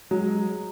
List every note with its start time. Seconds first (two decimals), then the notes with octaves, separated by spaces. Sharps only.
0.11 F#3 G#3